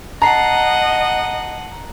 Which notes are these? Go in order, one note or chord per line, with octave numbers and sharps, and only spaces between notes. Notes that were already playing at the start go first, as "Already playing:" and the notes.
D#5 F#5 A5 A#5 C7